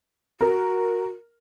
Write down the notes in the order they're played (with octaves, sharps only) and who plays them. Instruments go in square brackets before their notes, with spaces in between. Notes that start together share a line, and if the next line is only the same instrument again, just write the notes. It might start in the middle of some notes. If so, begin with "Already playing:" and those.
[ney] F#4 [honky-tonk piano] A#4